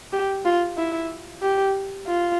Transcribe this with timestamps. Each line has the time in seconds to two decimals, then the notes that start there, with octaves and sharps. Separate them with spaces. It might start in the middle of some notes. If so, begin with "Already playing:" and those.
0.13 G4
0.45 F4
0.77 E4
1.42 G4
2.07 F4